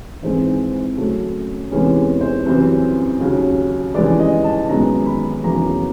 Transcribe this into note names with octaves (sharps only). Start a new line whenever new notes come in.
G#1 G#2 E3 G#3 C4 C5
F#2 C#3 F#3 A3
E2 C3 E3 G#3 C#4
C5
F#2 C#3 E3 G3 C4
D#2 C#3 F#3
F1 D#2 C#3 E3 G#3 D5
D#5
A5
G#1 F#2 D#3 G#3 B3 A#5
B5
F1 E2 C#3 F#3 A#3 A#5